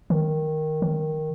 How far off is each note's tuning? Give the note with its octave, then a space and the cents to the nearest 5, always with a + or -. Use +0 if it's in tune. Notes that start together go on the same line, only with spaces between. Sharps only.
D#3 +0
D#3 +0